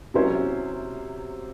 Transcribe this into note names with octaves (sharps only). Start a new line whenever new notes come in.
C3 F#3 C#4 E4 C5